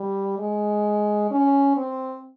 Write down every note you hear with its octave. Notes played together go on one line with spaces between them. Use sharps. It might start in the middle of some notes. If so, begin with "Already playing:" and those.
Already playing: G3
G#3
C#4
C4